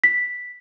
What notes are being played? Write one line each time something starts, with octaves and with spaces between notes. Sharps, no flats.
B6